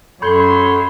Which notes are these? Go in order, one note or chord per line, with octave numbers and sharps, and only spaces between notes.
F#2 A4 C#5 B5 C6 G6